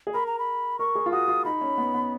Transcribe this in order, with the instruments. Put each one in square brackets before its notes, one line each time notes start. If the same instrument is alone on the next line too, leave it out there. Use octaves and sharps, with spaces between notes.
[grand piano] G#4
[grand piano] A#4 [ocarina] B5
[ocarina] A#5
B5
[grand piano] A#4 [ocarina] C#6
[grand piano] G#4
F4
[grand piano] F#4 [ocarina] D#6
[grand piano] F4
[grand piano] D#4 [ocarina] B5
[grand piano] C#4
B3
B3